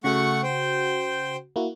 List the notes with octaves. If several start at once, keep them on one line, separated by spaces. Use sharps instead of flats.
C#3 A3 F#4 F#5 C#6
C5 G5
A#3 E4 F#4